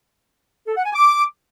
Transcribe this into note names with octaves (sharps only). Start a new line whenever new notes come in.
A4
F#5
G#5
D6